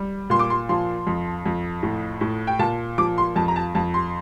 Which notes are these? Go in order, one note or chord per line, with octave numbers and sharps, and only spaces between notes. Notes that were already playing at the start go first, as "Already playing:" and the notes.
Already playing: G3
A#2 C6
D6
C6
F3 C6
F2
F2
A2
A2
G5
A#2 A5
F3 D6
C6
F2 A5
A#5
A5
F2 A5
C6